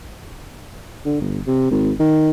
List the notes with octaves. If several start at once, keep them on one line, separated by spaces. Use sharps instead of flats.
D3
G1
C3
G#1
D#3